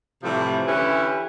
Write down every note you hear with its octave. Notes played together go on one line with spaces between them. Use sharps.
A2 C3 E3 F3 G3 A3
D3 E3 C#4 E4 G4 B4